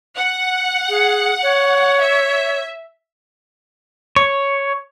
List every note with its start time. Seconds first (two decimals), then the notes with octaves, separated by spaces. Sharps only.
0.17 F#5
0.89 G#4
1.43 C#5
2.01 E5
4.16 C#5